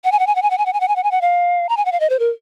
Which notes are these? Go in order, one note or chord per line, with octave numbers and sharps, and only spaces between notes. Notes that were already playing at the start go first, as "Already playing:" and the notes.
F#5
G#5
F#5
G#5
F#5
G#5
F#5
G#5
F#5
G#5
F#5
G#5
F#5
G#5
F#5
F5
A#5
G#5
F#5
F5
D#5
C5
A#4